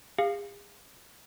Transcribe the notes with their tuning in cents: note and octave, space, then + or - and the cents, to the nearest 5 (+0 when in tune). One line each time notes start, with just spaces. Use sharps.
G#4 -40 F5 +0